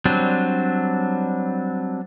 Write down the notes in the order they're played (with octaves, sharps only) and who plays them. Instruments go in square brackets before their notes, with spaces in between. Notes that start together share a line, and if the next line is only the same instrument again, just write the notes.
[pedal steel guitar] F#3 G3 C4 D4